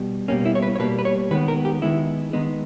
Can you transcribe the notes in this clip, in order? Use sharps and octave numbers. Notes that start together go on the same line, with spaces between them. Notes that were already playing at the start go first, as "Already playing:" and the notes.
Already playing: B2 G3
B2 G3 A#3 C#4
E4
C#5
B4
C#5
B2 G3 A#3 B4
B4
C#5
D#3 G#3 B3 B4
A#4
G4
D#3 G#3 B3 E4
D#3 G#3 B3 D#4